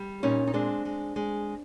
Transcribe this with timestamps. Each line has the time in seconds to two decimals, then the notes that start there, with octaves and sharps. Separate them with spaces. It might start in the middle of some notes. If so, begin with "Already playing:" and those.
Already playing: G3
0.23 A#2 C#4 D#4
0.47 D#4
0.53 G#3 C4 D4
0.85 G#3
1.16 G#3